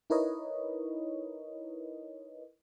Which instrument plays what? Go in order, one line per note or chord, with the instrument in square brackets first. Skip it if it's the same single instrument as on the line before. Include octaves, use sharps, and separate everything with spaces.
[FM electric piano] D#4 E4 A#4 B4 C#5 D#5